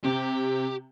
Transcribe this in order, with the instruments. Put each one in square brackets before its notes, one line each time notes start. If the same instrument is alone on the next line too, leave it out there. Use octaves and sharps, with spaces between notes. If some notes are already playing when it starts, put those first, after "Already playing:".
[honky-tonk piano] C3 [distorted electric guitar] G4